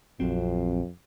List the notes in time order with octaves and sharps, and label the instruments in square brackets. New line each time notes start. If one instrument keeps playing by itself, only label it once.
[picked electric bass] A#1 F#3 C4 [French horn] F2